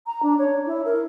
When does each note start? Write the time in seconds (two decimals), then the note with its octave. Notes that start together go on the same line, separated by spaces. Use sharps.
0.07 A#5
0.23 D4
0.39 C#5
0.66 E4
0.85 A#4